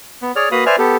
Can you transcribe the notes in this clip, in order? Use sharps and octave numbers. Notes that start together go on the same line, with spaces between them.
B3
G#4 C#5 D5 F6
A#3 F#4 B4 F5 B5 D#6
B4 C5 D5 E5 G#5 F6
B3 G4 A4